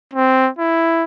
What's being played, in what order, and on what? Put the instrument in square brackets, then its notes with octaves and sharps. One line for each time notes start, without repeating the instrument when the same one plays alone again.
[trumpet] C4
E4